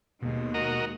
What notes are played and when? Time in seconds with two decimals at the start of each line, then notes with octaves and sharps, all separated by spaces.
0.22 D#2 B2 G#3
0.54 F#4 A#4 D#5